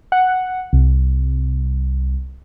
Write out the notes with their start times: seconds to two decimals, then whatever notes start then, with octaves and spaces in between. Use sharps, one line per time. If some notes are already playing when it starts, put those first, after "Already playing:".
0.12 F#5
0.73 C2